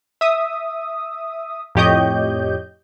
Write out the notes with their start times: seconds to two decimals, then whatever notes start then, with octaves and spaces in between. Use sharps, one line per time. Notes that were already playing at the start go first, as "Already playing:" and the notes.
0.21 E5 D#6
1.75 F2 A2 G4 C#5 D#5 G6